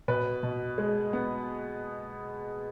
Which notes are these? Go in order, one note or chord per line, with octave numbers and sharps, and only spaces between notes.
B2 B4
B2
G#3
B3